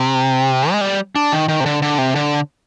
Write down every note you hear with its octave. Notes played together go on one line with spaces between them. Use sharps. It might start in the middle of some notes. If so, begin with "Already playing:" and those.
Already playing: C3
G#3
G3
D4
D#3
D#3
C3
D3
D3
C3
D3